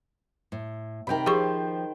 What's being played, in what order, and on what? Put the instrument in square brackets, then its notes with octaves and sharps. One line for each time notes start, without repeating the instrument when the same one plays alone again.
[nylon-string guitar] A2
[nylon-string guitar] C3 A#4 [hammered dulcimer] D#3 G5 B5
[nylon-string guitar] F3 [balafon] G4 G#4 C#6 [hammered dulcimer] C5